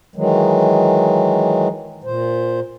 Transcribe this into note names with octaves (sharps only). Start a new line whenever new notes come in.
D#3 E3 F#3 G#3
A#2 C5